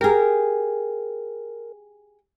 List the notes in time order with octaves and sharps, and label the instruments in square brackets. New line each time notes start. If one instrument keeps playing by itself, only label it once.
[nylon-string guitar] G4 G#4 [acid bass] A#4